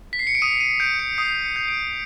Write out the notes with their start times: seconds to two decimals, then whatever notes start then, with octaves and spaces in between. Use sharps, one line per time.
0.13 B6
0.19 C7
0.27 C#7
0.35 D7
0.42 D#6 D#7
0.60 D#7
0.80 G6 D7
0.99 C#7
1.18 D#6 C7
1.43 C#7
1.56 G6
1.68 D7